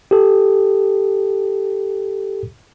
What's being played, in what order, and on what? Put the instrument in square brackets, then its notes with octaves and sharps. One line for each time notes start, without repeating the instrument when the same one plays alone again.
[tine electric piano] G4 A4